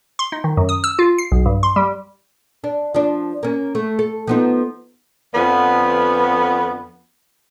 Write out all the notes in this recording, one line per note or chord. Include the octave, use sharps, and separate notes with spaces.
C6
D#4
D#3
F#2
D#6
E6
F4
C7
B1
G2
C6
G3
D4
F3 D4
A#3 C#4
A3
A4
F3 B3 D#4
F2 D3 F3 B3